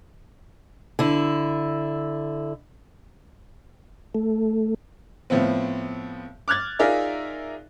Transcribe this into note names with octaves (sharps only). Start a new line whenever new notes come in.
D3 E4
A3
A2 F3 B3 C4
D6 F6 F#6 G#6 A6
D#4 F4 G#4 A#4 D5 E5